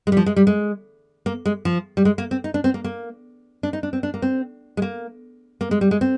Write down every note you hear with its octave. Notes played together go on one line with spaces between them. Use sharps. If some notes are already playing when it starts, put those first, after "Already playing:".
G#3
G3
F3
G#3
G3
G#3
A#3
G#3
F3
G3
G#3
A#3
C4
D#4
D4
C4
A#3
A#3
D4
D#4
D4
C4
D4
A#3
C4
G#3
A#3
A#3
G#3
G3
G#3
C4